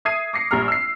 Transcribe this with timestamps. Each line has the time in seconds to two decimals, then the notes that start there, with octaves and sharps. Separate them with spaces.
0.05 E5 D#6 G#6 C7 D#7
0.33 D6 A#6 C7 C#7
0.51 A#1 G3 A#5 F6
0.68 E6 C7